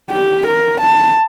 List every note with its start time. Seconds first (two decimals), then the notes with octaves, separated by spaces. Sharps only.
0.11 G4
0.48 A#4
0.81 A5